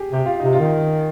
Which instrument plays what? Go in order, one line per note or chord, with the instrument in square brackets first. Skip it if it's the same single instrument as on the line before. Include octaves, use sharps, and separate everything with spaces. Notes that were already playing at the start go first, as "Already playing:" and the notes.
Already playing: [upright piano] G4 G#4
[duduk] C3 [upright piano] G4
[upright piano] F4
[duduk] C3 [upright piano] D#4
[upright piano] F4
[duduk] D#3